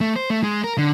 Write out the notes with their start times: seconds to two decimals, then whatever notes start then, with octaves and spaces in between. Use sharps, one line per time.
0.01 A3
0.16 C5
0.30 A3
0.44 G#3
0.64 A#4
0.78 D3